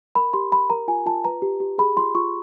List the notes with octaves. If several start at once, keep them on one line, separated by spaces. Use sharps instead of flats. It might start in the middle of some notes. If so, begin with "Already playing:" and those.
A#4 B5
G4 C6
G4 B5
A#4 A#5
F4 G#5
F4 A5
B4 A#5
G4
G4
G#4 B5
F4 C6
F4 C#6